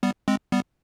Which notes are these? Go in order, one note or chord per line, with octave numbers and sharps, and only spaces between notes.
G3 B3
G#3 C4
G3 B3